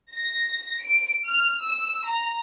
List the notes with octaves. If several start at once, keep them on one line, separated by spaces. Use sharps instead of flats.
A#6
D7
F6
E6
A#5